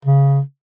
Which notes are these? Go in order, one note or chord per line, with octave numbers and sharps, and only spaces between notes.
C#3